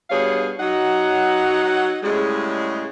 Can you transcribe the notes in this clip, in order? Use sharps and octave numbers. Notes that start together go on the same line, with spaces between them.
G2 B2 G3 G#4 C#5 F5
F#3 D#4 F#5
A2 C#3 G3 G#3